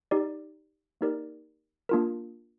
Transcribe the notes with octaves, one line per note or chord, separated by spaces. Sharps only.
D#4 G4 D5
A#3 D#4 G4 A#4 D5
A#3 D4 F4 A#4